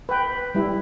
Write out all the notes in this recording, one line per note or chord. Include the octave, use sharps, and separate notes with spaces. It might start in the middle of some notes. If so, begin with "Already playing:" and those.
B4 G5
G3 E4